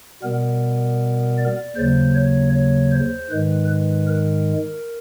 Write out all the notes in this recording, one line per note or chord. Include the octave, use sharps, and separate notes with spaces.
B2 G3 B3 A#4
D5
D#2 C#3 F#3 C5
C#5
C#5
C5
G#2 D#3 G#3 B4
B4
A#4